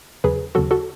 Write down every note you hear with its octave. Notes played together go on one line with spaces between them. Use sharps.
E2 C#3 F#3 G#4 B4
D#2 C#3 F#3 F#4 A4
F#4 A4